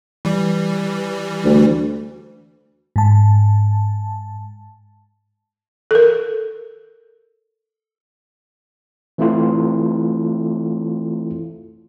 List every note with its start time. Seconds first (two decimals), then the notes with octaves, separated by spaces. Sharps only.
0.25 E3 G3
1.44 D2
2.96 G#2 A5
5.91 A4 A#4
9.18 E3 A3 C4 E4 F4 A4